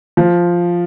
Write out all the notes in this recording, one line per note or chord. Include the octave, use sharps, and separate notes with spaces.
F3